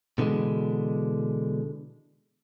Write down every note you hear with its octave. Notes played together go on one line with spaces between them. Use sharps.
B2 D3 E3 G#3